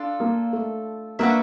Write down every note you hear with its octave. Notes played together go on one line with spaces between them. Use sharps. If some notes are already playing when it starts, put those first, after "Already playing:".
Already playing: D4 F4 A4
A#3
A3
A#3 D4 F#4 B4 E5